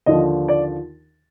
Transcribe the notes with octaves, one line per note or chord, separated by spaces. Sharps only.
D#2 D3 F3 D#5
D5